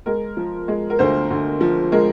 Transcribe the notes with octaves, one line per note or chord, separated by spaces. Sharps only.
G#3 A#4
F3
G#3
A#4
D2 C5
D2
F3
G#3 A#4